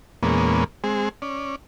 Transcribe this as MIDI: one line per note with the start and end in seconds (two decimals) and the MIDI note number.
0.23 0.64 40
0.23 0.64 46
0.23 0.64 56
0.23 0.64 58
0.23 0.64 59
0.23 0.64 61
0.84 1.09 56
0.84 1.09 60
0.84 1.09 68
1.22 1.56 61
1.22 1.56 74